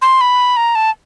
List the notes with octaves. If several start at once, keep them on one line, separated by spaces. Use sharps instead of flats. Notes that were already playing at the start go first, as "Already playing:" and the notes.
C6
B5
A#5
A5